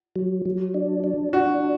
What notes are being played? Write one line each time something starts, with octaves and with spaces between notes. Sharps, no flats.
F#3
F#3
D4
D4
D4 F#4